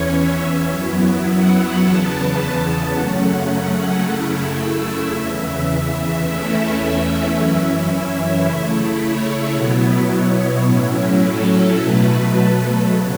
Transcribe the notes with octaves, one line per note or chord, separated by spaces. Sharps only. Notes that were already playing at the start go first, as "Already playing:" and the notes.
Already playing: E2 E3 C#4 C#5
E5
F#2 F#3 B3 E4
F#5
E2 C#3 E3 B3 A5
F#2 C#3 F#3 A3 C#4 F#5
F#2 C#3 A3 E4
E5
E2 C#3 E3 E5
E2 E3 A3 C#4 E4 E5
E5
F#2 E3 C#4 E4
C#3 A3 E4
C#5
B2 F#3 B3 E4
C#5
A2 F#3 C#4 E4
A4
B2 F#3 A3 B4
A4
C#3 F#3